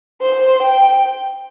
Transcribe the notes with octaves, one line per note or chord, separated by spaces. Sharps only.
C5
G5